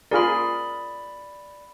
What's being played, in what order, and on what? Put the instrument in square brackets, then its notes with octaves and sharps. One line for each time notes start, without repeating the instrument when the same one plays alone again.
[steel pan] F4 G#4 A#4 [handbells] D5 B5